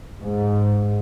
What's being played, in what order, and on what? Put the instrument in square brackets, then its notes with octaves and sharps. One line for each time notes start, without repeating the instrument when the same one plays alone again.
[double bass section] G#2